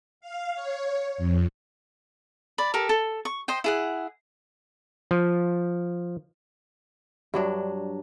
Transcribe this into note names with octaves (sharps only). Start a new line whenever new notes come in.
F5
C#5
F2
D5 B5
G4 A4 A#4
A4
C#6
C5 D#5 G5
E4 G#4 F#5
F3
G2 F#3 D4